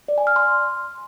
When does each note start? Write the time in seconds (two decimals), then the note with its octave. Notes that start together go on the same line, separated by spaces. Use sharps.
0.08 D5
0.18 G#5
0.27 F6
0.36 C6